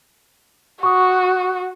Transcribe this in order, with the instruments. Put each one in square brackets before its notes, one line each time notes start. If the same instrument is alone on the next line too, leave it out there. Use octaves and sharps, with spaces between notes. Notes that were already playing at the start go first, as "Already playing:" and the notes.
[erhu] F#4 [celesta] C#6 D#6